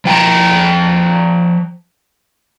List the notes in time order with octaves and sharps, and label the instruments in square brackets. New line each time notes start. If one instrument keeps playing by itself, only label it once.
[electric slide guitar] F3 G5 G#5 A#5